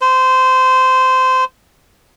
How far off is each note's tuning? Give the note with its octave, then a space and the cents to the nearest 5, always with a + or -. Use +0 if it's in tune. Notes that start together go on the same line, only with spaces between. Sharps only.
C5 -20